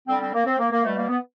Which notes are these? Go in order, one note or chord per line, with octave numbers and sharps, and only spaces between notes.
D3 G3 C4
C4
A#3
C4
A#3
A#3
B2 G3 A3
A#3
B3